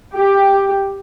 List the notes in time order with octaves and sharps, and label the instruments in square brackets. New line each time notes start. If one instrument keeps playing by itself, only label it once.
[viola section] G4